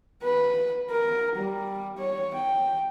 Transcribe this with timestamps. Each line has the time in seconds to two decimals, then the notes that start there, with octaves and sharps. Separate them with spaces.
0.23 B4
0.91 A#4
1.36 G3
1.98 C#5
2.34 G5